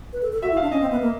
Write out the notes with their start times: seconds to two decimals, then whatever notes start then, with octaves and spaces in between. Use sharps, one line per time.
0.13 B4
0.22 A4
0.32 A4
0.42 F#4 E5
0.52 E4
0.57 D4 F5
0.71 C#4 D#5
0.81 C4
0.91 B3
1.01 A#3